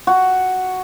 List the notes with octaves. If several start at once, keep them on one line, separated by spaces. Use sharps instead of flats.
F#4